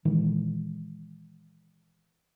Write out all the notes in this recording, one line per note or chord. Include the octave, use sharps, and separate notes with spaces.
A#2 D#3 E3 G#3